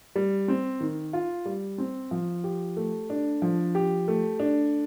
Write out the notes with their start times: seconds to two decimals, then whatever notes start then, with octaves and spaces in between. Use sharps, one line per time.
0.15 G3
0.48 C4
0.80 D#3
1.13 F4
1.46 G3
1.78 C4
2.11 F3
2.44 G4
2.77 A3
3.10 D4
3.42 F3
3.75 G4
4.08 A3
4.39 D4